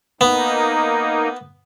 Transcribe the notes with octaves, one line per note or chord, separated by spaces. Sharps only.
A#3 B3 D#4